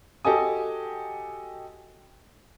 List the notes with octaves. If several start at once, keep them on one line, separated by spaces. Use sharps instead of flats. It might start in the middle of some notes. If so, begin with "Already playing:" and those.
F#4 G4 A4 D#5 G#5 D#6